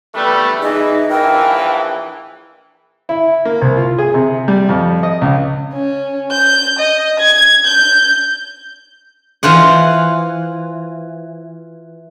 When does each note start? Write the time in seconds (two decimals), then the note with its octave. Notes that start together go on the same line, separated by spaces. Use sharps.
0.15 G3 A3 B3 B4
0.62 E3 D#4 G#4 D#5
1.10 A#1 E3 A#4 G5
3.09 E4
3.45 A#3
3.61 C2
3.77 F4
3.98 G#4
4.14 C3
4.48 G3
4.69 F2
5.03 D#5
5.21 C#2
5.74 C#4
6.31 G6
6.79 D#5
7.20 G#6
7.65 G6
9.43 E3 F4 C5 F#5